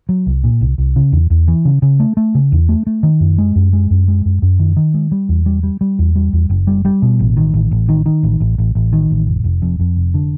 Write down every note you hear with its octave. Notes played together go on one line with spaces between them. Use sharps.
F#3
C2
A#2
C2
C2
C#3
E2
E2
E3
C#3
C#3
A3
A3
C#3
E2
A3
A3
D#3
F#2
G#3
F#2
G#3
F#2
G#3
F#2
F#2
D#3
D#3
G#3
G3
E2
G3
G3
G3
E2
G3
E2
F#1
G3
G3
B2
A1
D#3
A1
A1
D#3
D#3
A1
A1
A1
A1
D#3
A1
F1
F1
F2
F2
F1
D3